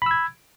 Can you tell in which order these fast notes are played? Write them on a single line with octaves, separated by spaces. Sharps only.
B5 E6 G#6